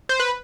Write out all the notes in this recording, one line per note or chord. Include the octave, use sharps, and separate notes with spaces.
C5
B4